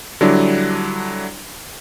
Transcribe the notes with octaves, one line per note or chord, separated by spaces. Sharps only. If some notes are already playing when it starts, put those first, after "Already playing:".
D3 F#3 G3 D4 E4